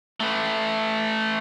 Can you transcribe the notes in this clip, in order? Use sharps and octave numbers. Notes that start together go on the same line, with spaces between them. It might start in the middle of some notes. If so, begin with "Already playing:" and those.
A3 B4